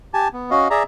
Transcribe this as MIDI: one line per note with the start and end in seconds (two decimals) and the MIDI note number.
0.14 0.28 67
0.14 0.28 80
0.14 0.28 81
0.34 0.51 59
0.51 0.68 61
0.51 0.68 66
0.51 0.68 75
0.51 0.68 77
0.70 0.83 68
0.70 0.83 74
0.70 0.83 76
0.70 0.83 82